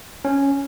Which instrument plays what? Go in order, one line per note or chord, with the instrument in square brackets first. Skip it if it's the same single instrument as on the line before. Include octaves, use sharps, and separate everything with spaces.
[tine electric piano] C#4